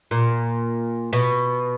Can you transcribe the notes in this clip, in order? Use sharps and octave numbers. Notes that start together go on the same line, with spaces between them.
A#2
B2